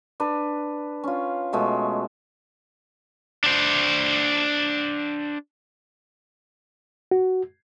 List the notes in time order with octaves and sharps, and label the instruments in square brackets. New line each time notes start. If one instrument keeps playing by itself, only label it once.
[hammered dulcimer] D4 B4
C#4 F4
B2 G#3 A3
[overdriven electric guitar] D4 C5
[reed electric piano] F#4